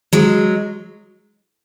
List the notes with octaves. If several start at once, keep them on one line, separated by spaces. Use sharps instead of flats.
F#3 G#3